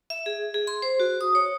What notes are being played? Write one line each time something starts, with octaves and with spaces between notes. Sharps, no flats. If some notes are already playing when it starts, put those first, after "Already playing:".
E5
G#4
G#4
C6
C5
F#4
D#6
C#5